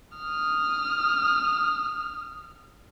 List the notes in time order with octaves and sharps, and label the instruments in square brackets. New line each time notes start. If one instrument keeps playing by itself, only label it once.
[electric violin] D#6 F6